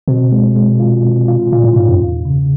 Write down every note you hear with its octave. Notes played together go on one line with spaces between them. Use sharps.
B2 C4
G#3
G#3
F4
C4
F4
A#2 F4
A2
G#2 F4
F#2
E2
C#3